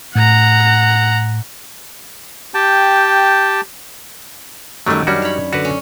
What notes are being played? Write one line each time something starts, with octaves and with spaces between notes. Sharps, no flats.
A2 F#5 A#5
G4 G5 A5
F#2 D#3 F#3 G3 A3
G3 C#4 D4 F#4
C#5 B5
D3 F#4 B4
C#4